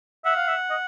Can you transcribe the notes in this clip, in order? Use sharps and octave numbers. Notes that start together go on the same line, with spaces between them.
E5 F#5
F5
E5
D#5